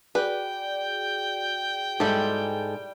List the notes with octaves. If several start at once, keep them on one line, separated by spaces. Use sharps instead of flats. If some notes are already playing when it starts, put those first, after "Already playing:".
F#4 G#4 B4 D5 G5
G#2 G3 G#3 E4 G4 A4